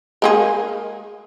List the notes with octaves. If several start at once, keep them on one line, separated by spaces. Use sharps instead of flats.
G#3 A#3 G#4